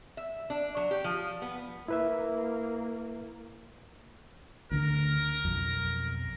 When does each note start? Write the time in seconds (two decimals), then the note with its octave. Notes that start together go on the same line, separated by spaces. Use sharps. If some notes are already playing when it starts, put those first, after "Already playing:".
0.17 E5
0.50 D4
0.77 F#3
0.91 G4
1.04 F3
1.42 B3
1.88 A#3 E4 B4 E5
4.72 D2 D3 D4 A#4
5.45 B1 F2